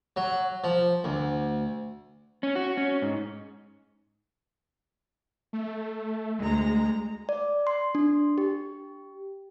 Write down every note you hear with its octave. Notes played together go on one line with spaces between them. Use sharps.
F#3
F3
D2
C#4
F#4
C#4
G#2
A3
D2 G#3 A#5
D5
C6
D4
G4